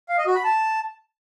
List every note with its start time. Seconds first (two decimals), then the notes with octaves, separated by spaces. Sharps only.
0.09 F5
0.18 D#5
0.27 F#4
0.35 B5
0.44 A5